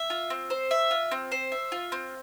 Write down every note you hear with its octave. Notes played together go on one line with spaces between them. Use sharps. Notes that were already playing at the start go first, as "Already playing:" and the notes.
Already playing: E5
F4
C4
C5
E5
F4
C4
C5
E5
F4
C4